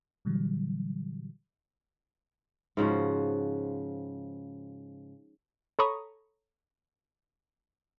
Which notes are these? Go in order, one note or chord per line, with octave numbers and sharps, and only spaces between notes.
A#2 D3 E3 F#3 G3
G#2 C#3 F3 F#4
A4 C#5 A#5 B5 C#6 D#6